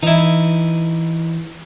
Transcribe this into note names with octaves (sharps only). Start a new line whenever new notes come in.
E3 D#4 E4